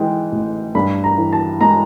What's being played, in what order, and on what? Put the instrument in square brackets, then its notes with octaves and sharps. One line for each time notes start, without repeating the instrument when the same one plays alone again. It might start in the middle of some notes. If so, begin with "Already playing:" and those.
Already playing: [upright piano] G#2 E3 G#3 G5
A1
G2 B5
A#5
E3
A5
G#3 A#5